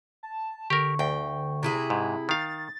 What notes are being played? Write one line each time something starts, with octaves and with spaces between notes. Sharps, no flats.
A5
D3 G4 A#4 C#6
D2 G5
C3 E4 G#4
G#2
D#3 F5 A6